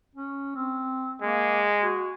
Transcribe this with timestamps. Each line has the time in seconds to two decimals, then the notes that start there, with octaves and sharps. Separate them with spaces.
0.15 C#4
0.56 C4
1.22 G#3 A#3
1.82 F#4